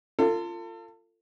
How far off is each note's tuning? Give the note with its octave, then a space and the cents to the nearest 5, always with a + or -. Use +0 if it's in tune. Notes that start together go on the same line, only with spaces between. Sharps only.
F4 -15 A4 +35